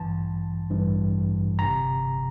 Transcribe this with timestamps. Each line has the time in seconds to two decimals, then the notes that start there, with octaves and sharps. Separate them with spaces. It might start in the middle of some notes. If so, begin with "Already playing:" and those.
Already playing: A1 G2 E3 A5
0.70 A1 G2 E3
1.59 G1 F2 C3 A#5